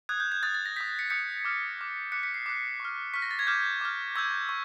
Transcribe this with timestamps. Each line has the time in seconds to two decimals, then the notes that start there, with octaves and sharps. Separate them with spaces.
0.09 D#6 F#6 G#6
0.20 G6
0.32 G#6
0.43 D#6 F#6 A6
0.54 A6
0.66 A#6
0.76 D#6 G6 B6
0.99 B6 C#7
1.10 D#6 G6 B6 C#7
1.45 D6 F6
1.78 D6 F6
2.12 D6 F#6 B6 C#7
2.23 B6 C#7
2.34 C7
2.46 D6 F#6 C7
2.80 C#6 F6
3.14 C#6 F6 B6
3.22 A#6
3.31 A6
3.39 G#6
3.47 D6 F6 G6
3.81 D6 F6
4.16 C#6 E6 G6 G#6
4.49 C#6